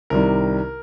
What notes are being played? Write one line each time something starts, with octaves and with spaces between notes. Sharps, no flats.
C2 C3 D#3 G3 A#4